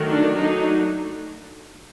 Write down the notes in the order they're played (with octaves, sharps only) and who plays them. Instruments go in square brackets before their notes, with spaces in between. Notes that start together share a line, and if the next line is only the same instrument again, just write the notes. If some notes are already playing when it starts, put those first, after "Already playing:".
Already playing: [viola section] D#3 F#3 A3
D4
F#3 A3 D4 D#4